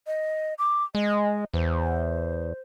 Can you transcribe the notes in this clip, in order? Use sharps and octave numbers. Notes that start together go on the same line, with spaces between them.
D#5
D6
G#3 D#5
E2 C5